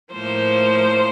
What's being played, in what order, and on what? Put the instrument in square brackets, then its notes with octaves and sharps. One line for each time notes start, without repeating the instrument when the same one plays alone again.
[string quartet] A2 F3 A#3 C5